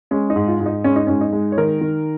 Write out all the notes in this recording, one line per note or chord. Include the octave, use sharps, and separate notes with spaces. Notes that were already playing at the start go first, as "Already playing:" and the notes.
G#3 C#4
D#4
G#2
F4
G#2
D#4
G#3 C#4
D#4
G#2 C#4
D#4
G#3
C#5
D#3 A#4
D#3